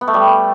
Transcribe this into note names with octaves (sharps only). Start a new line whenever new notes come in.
B3
A3
G3